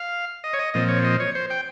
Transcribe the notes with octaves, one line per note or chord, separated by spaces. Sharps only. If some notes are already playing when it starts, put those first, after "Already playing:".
Already playing: F5
D#5
C#5
D#5
A#2 F3 C4 D#5
C#5
D#5
C#5
C5
G5